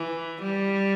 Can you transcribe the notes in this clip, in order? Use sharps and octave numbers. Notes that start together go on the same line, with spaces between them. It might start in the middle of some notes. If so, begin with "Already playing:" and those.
Already playing: E3
G3